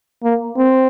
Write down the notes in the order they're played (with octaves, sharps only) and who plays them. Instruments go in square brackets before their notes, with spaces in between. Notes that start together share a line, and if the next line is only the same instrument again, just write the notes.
[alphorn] A#3
C4